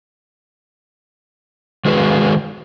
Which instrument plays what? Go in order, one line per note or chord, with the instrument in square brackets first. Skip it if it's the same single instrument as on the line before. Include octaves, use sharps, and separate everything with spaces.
[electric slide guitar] D#3 G#3 F#4 G#4 B4